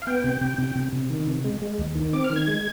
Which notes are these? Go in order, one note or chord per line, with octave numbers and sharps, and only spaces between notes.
F5
B3 G5
C3
C3
C3
C3
C3
D#3
C3
G#3
G#3
D#2
D#3
C4 D6
F6
D#3
G#6
G#3